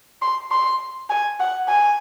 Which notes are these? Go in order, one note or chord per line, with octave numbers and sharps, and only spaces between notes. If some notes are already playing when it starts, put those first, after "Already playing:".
C6
C6
G#5
F#5
G#5